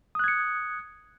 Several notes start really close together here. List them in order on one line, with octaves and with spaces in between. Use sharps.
D#6 F#6 G#6 C#7